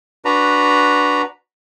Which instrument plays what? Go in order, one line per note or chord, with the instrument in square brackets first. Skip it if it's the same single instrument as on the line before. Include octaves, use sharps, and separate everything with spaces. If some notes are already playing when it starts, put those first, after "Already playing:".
[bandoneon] D4 F#4 B4 A#5